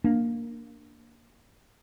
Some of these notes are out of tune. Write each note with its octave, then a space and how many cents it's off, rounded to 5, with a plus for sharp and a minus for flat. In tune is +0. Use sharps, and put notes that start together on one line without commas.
A#3 +0 D4 +0